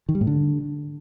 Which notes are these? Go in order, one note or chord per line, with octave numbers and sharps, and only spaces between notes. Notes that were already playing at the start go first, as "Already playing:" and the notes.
D#3
G3
A2
D3